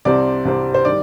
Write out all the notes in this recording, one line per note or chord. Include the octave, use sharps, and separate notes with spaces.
C2 C3 G3 C4 D5
C2 C3 G3 C4
C5
D#3 G3 D5